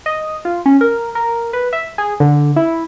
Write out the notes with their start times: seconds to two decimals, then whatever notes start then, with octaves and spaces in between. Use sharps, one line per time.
0.06 D#5
0.45 F4
0.66 C#4
0.81 A#4
1.15 A#4
1.53 B4
1.73 E5
1.98 G#4
2.20 D3
2.56 E4